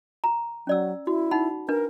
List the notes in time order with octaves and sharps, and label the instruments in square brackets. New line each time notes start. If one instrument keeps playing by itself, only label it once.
[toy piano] A#5
[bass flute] F#3 [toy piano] C#4 D5 E6
[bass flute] E4 [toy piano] F#4
[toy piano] D#4 F#5 B5
[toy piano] D4 B4 [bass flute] A#4